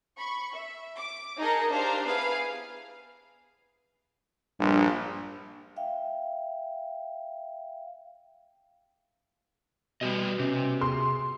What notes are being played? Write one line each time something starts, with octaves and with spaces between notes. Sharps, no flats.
B5 C#6
E5
D6
D#4 G#4 A#4 D#5 A5 C#7
D4 G4 C5 F5 A#5
B3 E4 G#4 B4 F5
A#1 G2
E5 F5 G5
B2 G3 G4 D#5
C3 C#4
G#4 C6